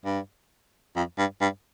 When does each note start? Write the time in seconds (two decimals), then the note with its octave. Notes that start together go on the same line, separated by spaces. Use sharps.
0.05 G2
0.96 F2
1.18 G2
1.41 G2